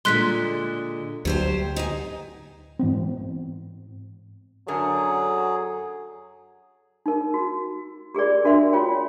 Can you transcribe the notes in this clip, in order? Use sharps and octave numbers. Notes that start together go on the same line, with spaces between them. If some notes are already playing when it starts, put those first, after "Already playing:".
A#2 D3 G#3 C6 F#6 B6
D2 F#3 G4 C5
D#4 G#5
G#2 E3 B3 C4
F#2 D3 F#3 G#4 A#4
D#4 A#4
F#4
G4 G#4 A#4 D5
D4 F#4 A#4 E5 C6
F4 F#4 C#5 G5